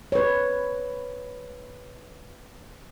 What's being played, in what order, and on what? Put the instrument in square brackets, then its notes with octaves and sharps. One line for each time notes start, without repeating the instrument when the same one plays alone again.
[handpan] B4 C#5